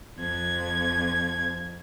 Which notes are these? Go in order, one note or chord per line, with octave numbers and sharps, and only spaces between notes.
F2 G#6